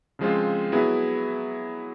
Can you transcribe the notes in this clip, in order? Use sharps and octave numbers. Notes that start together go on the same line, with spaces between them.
C#3 F3 G#3 C4 F4
F#3 B3 E4 G#4